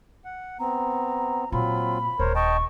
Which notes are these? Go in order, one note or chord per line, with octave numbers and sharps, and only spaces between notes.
F#5
B3 C4 A#5
A#2 F#3 A#3 C4 F4 B5
D#1 A#4 C5 C#5
D#5 G5 A5 C#6